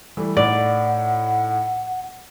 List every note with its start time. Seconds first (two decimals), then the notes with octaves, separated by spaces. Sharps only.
0.17 E3 G3 A3
0.37 A2 D#4 D5 F#5